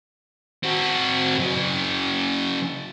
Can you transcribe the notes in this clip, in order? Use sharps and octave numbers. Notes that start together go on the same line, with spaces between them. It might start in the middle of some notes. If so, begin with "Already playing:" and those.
C4 F#4
C#3 F#3